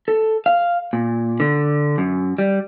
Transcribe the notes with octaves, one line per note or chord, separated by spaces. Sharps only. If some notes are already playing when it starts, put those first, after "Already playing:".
A4
F5
A#2
D3
F#2
G3